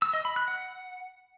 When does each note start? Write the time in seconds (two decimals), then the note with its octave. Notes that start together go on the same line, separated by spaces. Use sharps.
0.02 E6
0.13 D#5
0.25 B5
0.36 F#6
0.48 F#5